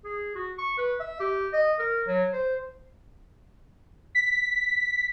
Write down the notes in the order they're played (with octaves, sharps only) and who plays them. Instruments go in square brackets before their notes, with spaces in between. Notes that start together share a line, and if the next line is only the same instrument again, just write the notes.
[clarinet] G#4
F#4
C#6
B4
E5
G4
D#5
A#4
F#3
C5
[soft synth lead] B6